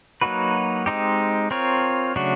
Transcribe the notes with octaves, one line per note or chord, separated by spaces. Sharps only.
F#3 A#3 D#4 F#4 B4
G#3 C4 D#4 G4
C4 F4 A#4 C#5
C#3 F#3 A3 D4 F#4